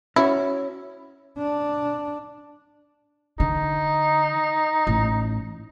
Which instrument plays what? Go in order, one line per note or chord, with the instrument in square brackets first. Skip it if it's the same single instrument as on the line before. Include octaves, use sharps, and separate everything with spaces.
[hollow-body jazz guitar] C#4 F#4 C#5 [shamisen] E4
[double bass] D4
[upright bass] D3 [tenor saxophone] D#4
[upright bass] A1